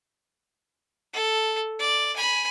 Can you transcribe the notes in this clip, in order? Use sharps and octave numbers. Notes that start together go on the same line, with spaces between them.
A4
D5
G#5 B5